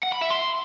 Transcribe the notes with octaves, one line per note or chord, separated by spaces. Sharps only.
F#5
B5
E5
C6